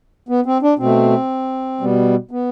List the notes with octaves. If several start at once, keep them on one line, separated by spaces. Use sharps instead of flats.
B3
C4
D4
B2 A3 C4
B2 G3 B3
B3